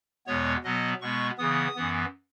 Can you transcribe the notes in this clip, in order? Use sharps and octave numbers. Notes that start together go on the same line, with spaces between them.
E2 B2 G#3 B3 C#5
B2 F#3 B3 D#5
B2 G#3 B3 C#6
C#3 E3 B3 D#6
F#2 E3 B3